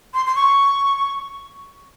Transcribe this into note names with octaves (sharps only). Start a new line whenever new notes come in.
C6
C6
C#6